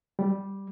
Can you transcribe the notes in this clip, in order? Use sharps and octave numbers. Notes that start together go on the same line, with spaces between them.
G3